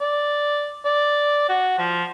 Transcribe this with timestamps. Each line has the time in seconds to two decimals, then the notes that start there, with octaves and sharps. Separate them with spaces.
0.01 D5
0.85 D5
1.49 F#4
1.78 F3